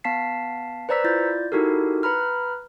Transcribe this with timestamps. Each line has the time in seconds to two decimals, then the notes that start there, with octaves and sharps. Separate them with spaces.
0.04 B3 F5 A5 B6 C7
0.89 B4 C5 D5 A#5 E6 B6
1.04 E4 F4 D5 G6 A6
1.52 D#4 E4 F#4 G4 A4 A#4
2.03 B4 A#5 B5 F6